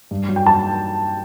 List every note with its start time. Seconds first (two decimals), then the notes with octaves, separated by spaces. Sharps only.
0.11 G2
0.28 F#3
0.36 G5
0.46 A5